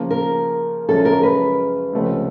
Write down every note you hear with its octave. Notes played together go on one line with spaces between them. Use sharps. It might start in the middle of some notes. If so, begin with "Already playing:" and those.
Already playing: C#3 F3 A#3
A#4
F#2 C#3 F3 G#3 C#4 A4
A#4
B4
C#2 C3 F3 A3 C#4